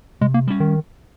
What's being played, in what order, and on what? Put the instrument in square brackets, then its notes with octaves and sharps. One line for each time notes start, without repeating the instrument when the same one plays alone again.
[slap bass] C3 [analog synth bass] G#3
[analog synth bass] A#3
[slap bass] G3 C#4
[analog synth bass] D#3